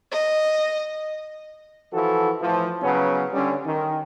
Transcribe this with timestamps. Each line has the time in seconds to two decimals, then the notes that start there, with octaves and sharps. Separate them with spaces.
0.11 D#5
1.93 E3 F3 F#4 A4
2.40 A2 E3 F3
2.81 C#3 F#3 B3 C#4 B4
3.32 D3 G3 C#4
3.65 D#3